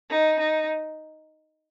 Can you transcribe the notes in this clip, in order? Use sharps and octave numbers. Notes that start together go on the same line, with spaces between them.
D#4
D#4